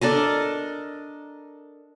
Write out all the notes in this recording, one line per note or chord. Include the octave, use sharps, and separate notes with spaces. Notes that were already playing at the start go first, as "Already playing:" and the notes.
D4 A4 A#4 D#5